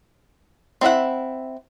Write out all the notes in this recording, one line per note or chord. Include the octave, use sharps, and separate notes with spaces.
C4 E4 E5 F#5